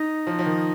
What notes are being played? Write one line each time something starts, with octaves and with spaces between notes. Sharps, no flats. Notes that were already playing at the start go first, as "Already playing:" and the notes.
Already playing: D#4
F3
F3
D#3